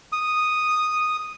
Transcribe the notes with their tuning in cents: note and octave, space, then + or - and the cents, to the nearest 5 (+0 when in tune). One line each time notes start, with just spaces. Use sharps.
D#6 -5